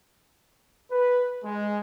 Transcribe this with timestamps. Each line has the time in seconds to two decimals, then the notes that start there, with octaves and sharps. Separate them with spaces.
0.92 B4
1.43 G#3